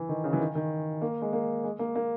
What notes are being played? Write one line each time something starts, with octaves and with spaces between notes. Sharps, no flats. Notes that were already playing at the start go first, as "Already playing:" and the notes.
Already playing: E3
D#3
C#3
E3
D#3
D#3
A#3
G#3
A#3
G#3
A#3
A#3